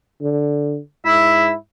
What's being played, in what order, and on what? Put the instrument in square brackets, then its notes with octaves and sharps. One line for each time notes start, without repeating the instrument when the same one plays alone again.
[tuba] D3
[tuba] G#2 [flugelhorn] E4 [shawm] E5